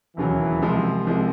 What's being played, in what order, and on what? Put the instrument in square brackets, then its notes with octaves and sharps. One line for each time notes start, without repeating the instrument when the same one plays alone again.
[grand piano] E1 D#2 C#3 F#3 [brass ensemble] E3
[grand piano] C2 C3 F3 G#3
C2 C3 F3 G#3